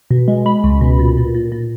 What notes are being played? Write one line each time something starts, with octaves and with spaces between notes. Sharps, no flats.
B2
G#3
G#3 B5
C#2
B2
A#2
A#2
A#2
A#2